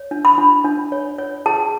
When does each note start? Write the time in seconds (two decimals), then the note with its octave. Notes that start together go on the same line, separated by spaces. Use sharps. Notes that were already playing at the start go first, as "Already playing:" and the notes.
Already playing: C#5
0.11 D4
0.25 B5
0.38 D4
0.64 D4
0.92 C#5
1.18 C#5
1.46 G#4 A5